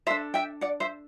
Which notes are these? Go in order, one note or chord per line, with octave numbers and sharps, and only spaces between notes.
D4 A4 C5 E5
E5 G5
D5 F#5
C5 E5